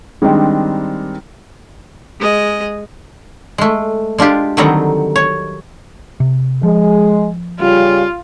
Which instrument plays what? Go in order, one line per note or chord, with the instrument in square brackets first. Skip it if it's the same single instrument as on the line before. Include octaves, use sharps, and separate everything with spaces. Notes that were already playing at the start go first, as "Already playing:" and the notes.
[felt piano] D#3 G3 G#3 C4 D4 D#4
[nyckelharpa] G#3 D#5
[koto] G#3 A3
G#3 D4 F4 G4
D3 D#3 F#3 G3 C4 D#4
C#5
[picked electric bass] C3
[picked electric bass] F3 [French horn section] G#3
[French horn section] C#3 G3 [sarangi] F4